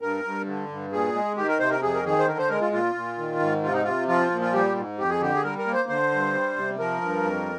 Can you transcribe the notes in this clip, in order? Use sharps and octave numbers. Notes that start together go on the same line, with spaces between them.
G2 A#4
G2
D3
G2
A#2 G#4
G#3
D#3 G4
A#4
C3 C5
A#4
F2 G#4
A#4
D#3 G#4
C5
D3 A#4
C5
G#3 A#4
F4
A#2 F4
A#2
D#3
G#2
C3 F4
D#4
C3 F4
F3 F4
A#2
F4
G3 G4
G#2
F2 G4
G#4
D3 G4
G#4
G3 A#4
A#4
A#3
C5
D3 C5
G2
G3
C3
F3 A#4
G2
F2